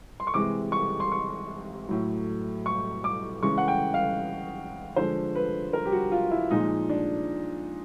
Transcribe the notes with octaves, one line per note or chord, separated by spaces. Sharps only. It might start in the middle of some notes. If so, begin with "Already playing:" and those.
C6
C#6
C3 E3 G#3 D6
C#6
C6
C#6
A2 F#3
C#6
D6
C#3 E3 G#3 C#6
F#5
G5
F5
D3 F3 G#3 C5
B4
A#4
G4
F#4
F4
E4
A#2 F3 G#3 D#4
D4